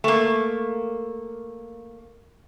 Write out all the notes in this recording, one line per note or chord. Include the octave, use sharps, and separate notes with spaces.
A3 A#3